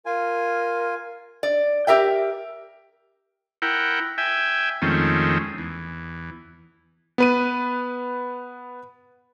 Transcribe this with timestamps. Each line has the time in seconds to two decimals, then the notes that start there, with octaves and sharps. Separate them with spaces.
0.06 F4 A#4 G#5
1.43 D5
1.87 G4 A#4 E5 G5
3.62 E4 A#4 F#5 G5
4.18 E5 G5 G#5
4.82 F2 D#3 G#3 A3 C4 C#4
5.58 E2
7.18 B3 B4 D#7